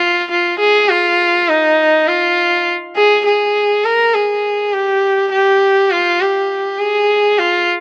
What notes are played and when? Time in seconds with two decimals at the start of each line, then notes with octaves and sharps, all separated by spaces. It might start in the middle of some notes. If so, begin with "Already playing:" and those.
Already playing: F4
0.31 F4
0.59 G#4
0.89 F4
1.49 D#4
2.08 F4
2.96 G#4
3.26 G#4
3.85 A#4
4.14 G#4
4.73 G4
5.31 G4
5.91 F4
6.21 G4
6.79 G#4
7.39 F4